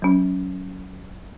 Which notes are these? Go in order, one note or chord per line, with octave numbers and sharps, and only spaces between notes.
F#3 C#4